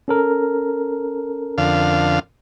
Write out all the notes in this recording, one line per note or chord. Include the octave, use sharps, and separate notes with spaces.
C#4 A4 A#4
F2 D3 F5